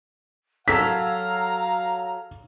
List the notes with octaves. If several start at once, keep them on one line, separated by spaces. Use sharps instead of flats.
F#3 A4 F5 A#5 B6